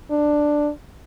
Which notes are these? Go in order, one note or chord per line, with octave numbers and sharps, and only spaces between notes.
D4